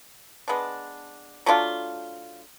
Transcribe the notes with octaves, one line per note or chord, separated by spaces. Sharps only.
G#3 B3 D4
F#3 A3 D4 F4